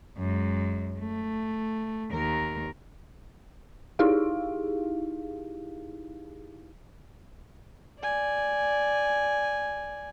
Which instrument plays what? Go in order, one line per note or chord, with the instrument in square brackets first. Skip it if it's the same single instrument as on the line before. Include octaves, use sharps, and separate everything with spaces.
[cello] F#2 G#3
A3
D#2 A#4
[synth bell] D#4 E4 G4 G#4 F5
[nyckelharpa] D5 G#5